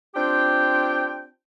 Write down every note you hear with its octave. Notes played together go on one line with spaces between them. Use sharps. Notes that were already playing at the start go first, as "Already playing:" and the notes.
C4 D4 F4 G4 G5